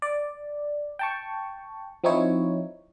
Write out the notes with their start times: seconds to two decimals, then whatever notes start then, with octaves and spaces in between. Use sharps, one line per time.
0.02 D5
0.99 G5 A5 C#6
2.04 F3 C4 D#4 E4 C#5